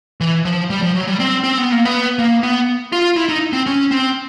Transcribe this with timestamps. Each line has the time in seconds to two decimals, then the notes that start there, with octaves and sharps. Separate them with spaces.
0.20 E3
0.45 F3
0.70 G3
0.82 F3
0.95 F#3
1.07 G3
1.20 C4
1.44 C4
1.58 B3
1.72 A#3
1.85 B3
2.19 A#3
2.43 B3
2.92 F4
3.16 E4
3.29 D#4
3.53 C4
3.66 C#4
3.91 C4